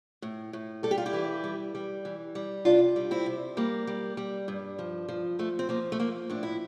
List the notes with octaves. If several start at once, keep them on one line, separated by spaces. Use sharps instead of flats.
A2
A2
G3 A4
G4
F4
E4 G4
E3
G3
G3
E3
G3
C3 D4 F4
G3
C4 E4
C3
G3 A#3
G3
G3
G2
F3
F3
F3 A3
C4
F3 A#3
A3
F3 A#3
A2 D4
E4